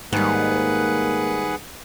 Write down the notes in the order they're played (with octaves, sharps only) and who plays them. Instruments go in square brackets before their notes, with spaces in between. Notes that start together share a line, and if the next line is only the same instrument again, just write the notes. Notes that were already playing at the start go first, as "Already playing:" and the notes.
[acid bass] G#2 [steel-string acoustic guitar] D#3 G3 [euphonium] A#3 [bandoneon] G#4 B4 F#5